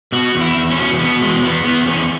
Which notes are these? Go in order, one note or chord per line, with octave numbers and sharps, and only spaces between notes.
B2 F#4
E2
E4
E2
C#4
B2
B2 B3
E2 G#3
E2 B3
E2 B3
E2 C#4